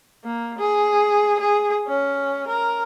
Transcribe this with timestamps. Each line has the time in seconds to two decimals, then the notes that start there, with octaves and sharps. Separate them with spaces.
0.24 A#3
0.58 G#4
1.40 G#4
1.87 C#4
2.48 A#4